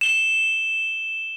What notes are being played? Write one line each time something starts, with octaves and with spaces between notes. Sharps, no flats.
E7 G7